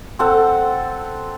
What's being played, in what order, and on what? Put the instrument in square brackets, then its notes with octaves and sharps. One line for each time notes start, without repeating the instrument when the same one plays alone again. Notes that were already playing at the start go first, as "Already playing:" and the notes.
[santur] C4 A4 F#5